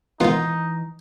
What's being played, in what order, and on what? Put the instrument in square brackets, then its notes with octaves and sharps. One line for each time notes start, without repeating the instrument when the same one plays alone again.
[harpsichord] G#2 D#3 [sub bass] E3 [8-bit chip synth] B3 F4 [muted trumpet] D#4